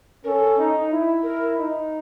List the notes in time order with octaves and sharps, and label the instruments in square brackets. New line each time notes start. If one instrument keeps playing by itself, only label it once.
[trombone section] C#4 [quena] A#4
[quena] A4
[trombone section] D#4
E4
[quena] A#4
[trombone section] D#4